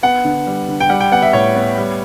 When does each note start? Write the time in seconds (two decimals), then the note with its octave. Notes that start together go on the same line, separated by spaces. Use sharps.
0.03 B3 F#5
0.25 D3
0.47 G3
0.68 D3
0.80 G5
0.89 G3 F#5
1.00 G5
1.12 B3 F#5
1.22 E5
1.33 A2 C#5
1.56 B3
1.78 G3